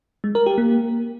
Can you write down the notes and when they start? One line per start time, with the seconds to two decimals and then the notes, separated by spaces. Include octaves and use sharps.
0.24 G#3
0.35 A#4
0.46 G4
0.58 A#3